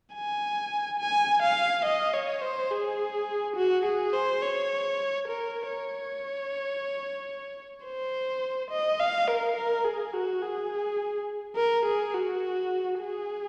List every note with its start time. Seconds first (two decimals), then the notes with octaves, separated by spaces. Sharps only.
0.14 G#5
0.99 G#5
1.42 F5
1.85 D#5
2.13 C#5
2.41 C5
2.71 G#4
3.56 F#4
3.85 G#4
4.13 C5
4.42 C#5
5.28 A#4
5.70 C#5
7.85 C5
8.70 D#5
8.99 F5
9.27 A#4
9.56 A#4
9.85 G#4
10.14 F#4
10.42 G#4
11.56 A#4
11.86 G#4
12.14 F#4
12.99 G#4